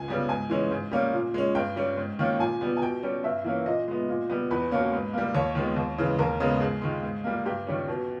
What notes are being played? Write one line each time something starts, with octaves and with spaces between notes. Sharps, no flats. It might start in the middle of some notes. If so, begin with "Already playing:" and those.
Already playing: C#2 G#5
C#3 G3 B3
G#2 G#5
E3 G#3 C#4
G#2
G3 A#3 C#4
A#2
G#3 C#4
G2 G5
G3 C#4
G#2
D#3 A#3 C#4
A#2 G#5
G3 B3
G#5
B2 G5
G3 C#4
G2 E5
E3 A#3 C#4
A#2 D#5
G#3 B3
A#2
G3 B3
E2 B4
B2 A#3 C#4
G#2
G3 A#3
D#2 C#5
D#3 G#3 B3
D#2
C#3 E3 G#3
D#2 A#4
C#3 G#3 B3
G#2 G#4
D#3 G#3
G#2
G3 A#3
G2 G4
D#3 G3 C#4
B2